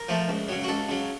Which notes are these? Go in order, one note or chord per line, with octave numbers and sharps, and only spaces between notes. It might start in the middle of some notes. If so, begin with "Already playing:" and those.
Already playing: A#4
F3 A3
C#2
C#3 F#3
F#4
C#2 A4
C#3 F#3